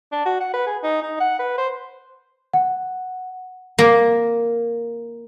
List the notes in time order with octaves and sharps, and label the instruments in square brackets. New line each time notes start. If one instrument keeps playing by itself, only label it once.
[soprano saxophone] D4
F#4
F#5
B4
G#4
D#4
D#4
F#5
B4
C5
[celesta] F#5
[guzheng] A#3